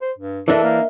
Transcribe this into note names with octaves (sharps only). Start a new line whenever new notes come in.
C5
G2
E3 D4 A4 A#4 D#5 E5
A#3